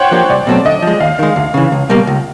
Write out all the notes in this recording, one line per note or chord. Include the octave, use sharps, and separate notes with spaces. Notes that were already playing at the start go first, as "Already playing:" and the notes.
Already playing: C5 C#5 F#5 G5
F3 A#3 D4 G4
C2 D5
B2 F#3 A3 C4
D3 D#5
F3 G#3
D#2 F5
D#3 G#3
D2 F5
C#3 E3
C#2
B2 G3 A#3
C#2